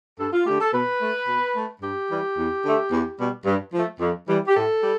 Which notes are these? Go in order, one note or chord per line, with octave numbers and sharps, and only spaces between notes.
G2 A4
F4
D3 A3 G4
A4
B2 B4
A3
B2
A3
G2 G4
E3 G3
E2
D3 A3
E2
B2 G3
G2
F3 A3
F2
E3 G3
G4
A2 A4
G3